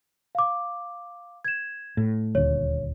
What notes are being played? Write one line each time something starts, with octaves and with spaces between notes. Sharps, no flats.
F5 D6
G#6 E7
A2
D#1 D2 C#5